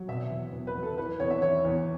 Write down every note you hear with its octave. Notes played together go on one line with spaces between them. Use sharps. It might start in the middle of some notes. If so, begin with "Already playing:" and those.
Already playing: F#3
B2 E5
E2
E2
B4
F#3
A4
E3 B4
E2 C#5
E5
E3 C#5
E2